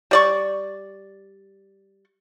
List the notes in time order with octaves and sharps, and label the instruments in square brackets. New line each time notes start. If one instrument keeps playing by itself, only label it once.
[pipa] G3 D5 C#6